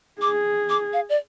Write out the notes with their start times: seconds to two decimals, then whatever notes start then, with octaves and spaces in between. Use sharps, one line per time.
0.22 G#4 D6
0.70 D6
0.93 F5
1.09 D5